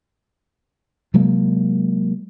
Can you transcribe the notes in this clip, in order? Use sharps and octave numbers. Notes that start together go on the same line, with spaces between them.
C3 F#3 G#3 A#3